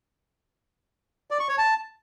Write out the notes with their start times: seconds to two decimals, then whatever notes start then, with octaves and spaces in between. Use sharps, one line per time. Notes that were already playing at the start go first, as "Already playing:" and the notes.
1.31 D5
1.40 C#6
1.49 C#5
1.58 A5